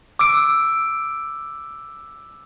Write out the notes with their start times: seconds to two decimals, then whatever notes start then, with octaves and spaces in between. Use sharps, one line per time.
0.19 D6 E6 D7